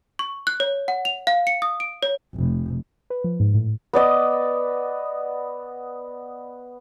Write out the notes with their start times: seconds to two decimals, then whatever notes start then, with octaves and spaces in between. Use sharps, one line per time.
0.19 C#6
0.47 F#6
0.60 C#5
0.88 F#5
1.05 F7
1.27 F5
1.47 C#7
1.62 D#6
1.80 D7
2.03 C#5
2.34 F1
3.10 B4
3.24 F3
3.40 G#2
3.54 A2
3.93 B3 D5 D#5